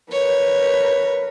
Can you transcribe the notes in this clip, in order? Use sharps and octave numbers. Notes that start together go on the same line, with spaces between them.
A#4 B4 C#5